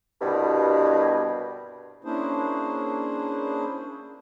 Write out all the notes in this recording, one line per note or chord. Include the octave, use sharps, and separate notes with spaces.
C2 G2 B2
A#3 C#4 D4 E4 G#4 C5